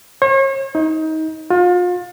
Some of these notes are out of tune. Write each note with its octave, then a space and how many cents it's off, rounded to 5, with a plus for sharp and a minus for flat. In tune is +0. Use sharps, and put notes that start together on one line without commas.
C#5 -40
D#4 +25
F4 +35